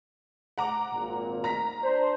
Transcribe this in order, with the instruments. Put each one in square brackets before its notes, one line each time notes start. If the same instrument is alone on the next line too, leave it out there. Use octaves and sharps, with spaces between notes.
[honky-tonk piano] F#5 A#5 D6
[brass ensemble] G#1 A#2
[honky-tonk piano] A#5 A#6 B6
[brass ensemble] D4 C5